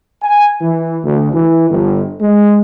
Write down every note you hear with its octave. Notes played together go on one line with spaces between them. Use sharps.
G#5
E3
D2
E3
G1
G#3